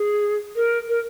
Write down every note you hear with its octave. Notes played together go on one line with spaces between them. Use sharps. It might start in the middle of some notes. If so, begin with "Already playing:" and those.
Already playing: G#4
A#4
A#4